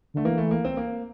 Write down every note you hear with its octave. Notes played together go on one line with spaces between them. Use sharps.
D3 A3
E3 A#3
A3
A#3
C4
A#3